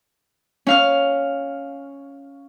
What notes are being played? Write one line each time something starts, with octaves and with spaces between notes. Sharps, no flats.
C#4 F5 F6